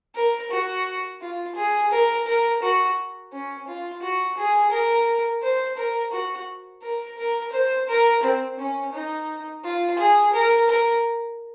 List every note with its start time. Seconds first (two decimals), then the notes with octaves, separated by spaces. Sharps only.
0.16 A#4
0.51 F#4
1.21 F4
1.56 G#4
1.91 A#4
2.27 A#4
2.62 F#4
3.32 C#4
3.68 F4
4.02 F#4
4.38 G#4
4.72 A#4
5.42 C5
5.77 A#4
6.12 F#4
6.83 A#4
7.18 A#4
7.53 C5
7.89 A#4
8.23 C4
8.59 C#4
8.93 D#4
9.65 F4
9.99 G#4
10.34 A#4
10.69 A#4